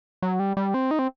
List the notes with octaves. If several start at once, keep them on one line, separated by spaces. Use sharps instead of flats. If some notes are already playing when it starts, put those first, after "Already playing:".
F#3
G3
G3
C4
D#4
C4